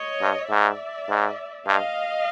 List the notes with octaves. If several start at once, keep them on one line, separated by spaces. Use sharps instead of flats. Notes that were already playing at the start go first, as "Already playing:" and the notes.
Already playing: C#5 D#5
G2
G#2 D5 E5
G#2
G2 D#5 F5